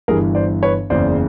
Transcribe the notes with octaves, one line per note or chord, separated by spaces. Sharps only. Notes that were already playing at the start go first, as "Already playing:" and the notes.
G1 G2 E3 G#4 A#4
C5 D5
B4 C#5
F#1 E2 C#3 C5 D5